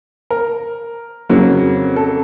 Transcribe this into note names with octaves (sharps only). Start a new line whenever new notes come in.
A#4
F2 C#3 F#3 A#3
A4